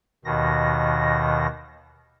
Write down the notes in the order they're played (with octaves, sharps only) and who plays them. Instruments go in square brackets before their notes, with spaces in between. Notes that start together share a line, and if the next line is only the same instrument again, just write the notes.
[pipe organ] D#2 B2 D#3 A#6